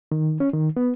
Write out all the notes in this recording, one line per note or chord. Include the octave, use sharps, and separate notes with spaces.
D#3
C#4
D#3
B3